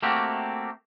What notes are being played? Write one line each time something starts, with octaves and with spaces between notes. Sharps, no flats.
A3 A#3 C4 F#4 G4